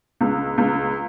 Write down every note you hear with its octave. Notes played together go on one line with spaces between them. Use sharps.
C#2
C#2